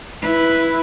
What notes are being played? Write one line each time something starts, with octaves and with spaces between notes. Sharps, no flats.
E4 B4